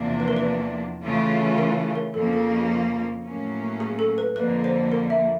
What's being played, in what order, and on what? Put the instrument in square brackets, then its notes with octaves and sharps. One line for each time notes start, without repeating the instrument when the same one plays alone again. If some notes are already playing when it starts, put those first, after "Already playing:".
Already playing: [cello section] E2 C3 F3 A#3 D4
[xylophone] B4
A#4
B4
[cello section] C#3 E3 A3 C#4 F4
[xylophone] A#4
A#4
[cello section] F2 C#3 F3 A#3 [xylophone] A4
[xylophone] A4
G#4
[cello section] A2 F#3 A#3 C#4
[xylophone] G#4
A4
B4
[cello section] F2 D3 F3 A#3 [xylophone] B4
[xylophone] C5
A#4
E5